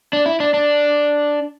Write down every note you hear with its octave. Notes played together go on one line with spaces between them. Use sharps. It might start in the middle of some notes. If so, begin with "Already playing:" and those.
D4
E4
D4
D4